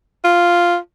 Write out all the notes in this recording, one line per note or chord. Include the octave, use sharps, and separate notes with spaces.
F4